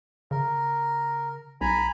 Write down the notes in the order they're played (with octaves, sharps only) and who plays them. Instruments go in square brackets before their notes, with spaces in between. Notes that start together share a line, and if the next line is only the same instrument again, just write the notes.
[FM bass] C#3 [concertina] A#4
[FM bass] B1 [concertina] G#5 A#5 B5